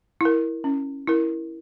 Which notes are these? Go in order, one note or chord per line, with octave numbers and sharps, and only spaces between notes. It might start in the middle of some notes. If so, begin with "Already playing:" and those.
E4 A#4
C#4
E4 A#4